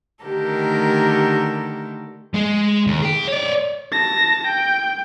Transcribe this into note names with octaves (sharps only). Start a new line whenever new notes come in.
D3 D#3 A3 G4 A4 A#4
G#3 G#4
D#2
G#4 G5
C#5 D5
A5 A#6
G5